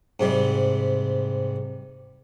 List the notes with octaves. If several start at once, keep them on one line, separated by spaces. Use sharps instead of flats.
G#2 C3 G3